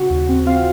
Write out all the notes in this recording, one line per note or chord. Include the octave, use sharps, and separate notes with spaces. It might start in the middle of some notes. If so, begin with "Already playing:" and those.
Already playing: C#3 F#4 F#5
D#2
C4
C4 F4 F5